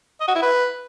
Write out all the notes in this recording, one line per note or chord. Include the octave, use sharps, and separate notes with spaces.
D#5
F#4
E4
B4